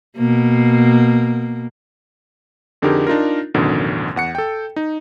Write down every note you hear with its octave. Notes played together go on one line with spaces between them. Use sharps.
B2 A#3
F2 D3 D#4 G4 G#4 A#4
D4 D#4 F4 A#4
A1 F#2 B2 D3 D#3
E2 F#5 C#7
A4 G5
D#4